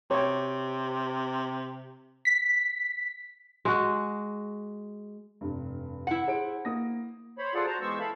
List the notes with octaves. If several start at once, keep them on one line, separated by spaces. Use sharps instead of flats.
C3 C#5 G5
B6
G#3 F#4
F1 G2
E4 F#5
G#4 C5 D7
A#3 D#6 A#6
C5 C#5 B5
F4 G#4 A4 C5 D5 F#5
F#4 C5 A5 A#5
E3 G#3 B3 C5 C#6 E6
E4 A4 F5 A5 B5